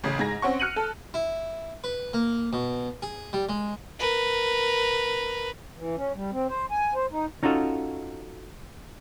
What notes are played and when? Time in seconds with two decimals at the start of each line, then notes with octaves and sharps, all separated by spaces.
0.04 A1 C#3
0.19 G#2 G#4 A#6
0.42 C4 C#4 F#5 C#6
0.60 F6 F#6 C#7 D#7 F#7
0.76 A4
1.14 E4
1.84 B4
2.13 A#3
2.53 B2
3.02 G#4
3.33 G3
3.49 G#3
3.99 A#4 B4
5.77 E3
5.97 C#4
6.15 G3
6.32 C4
6.49 C5
6.71 G#5
6.95 C5
7.12 D#4
7.43 C#4 D#4 F4 F#4 A4 D#5